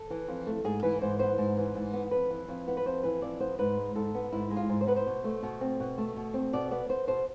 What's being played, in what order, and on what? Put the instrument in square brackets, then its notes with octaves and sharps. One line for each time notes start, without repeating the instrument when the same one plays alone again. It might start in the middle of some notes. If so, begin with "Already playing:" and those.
Already playing: [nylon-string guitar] A4
E3
F2
A3
G#2 G#4
E3 B4
G#2 C5
B3 C5
G#2
E3
G#2
B3
F2 B4
E3
F2
B3
B4
F2 C5
E3 B4
F2 D5
B3 C5
G#2 B4
G#3
G#2 A4
B3
G#2 E4
G#3
F4
G#2
C5
B3 B4
C5
B2
A3
B2
C4
B2
A3
B2
C4
B2 D5
B3 D5
B3 C5
B2 C5